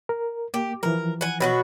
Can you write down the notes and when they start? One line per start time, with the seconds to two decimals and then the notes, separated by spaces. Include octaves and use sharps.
0.09 A#4
0.54 A#3 G4
0.83 E3 F3 A#4
1.21 F#5 G#5
1.41 B2 F#3 F#4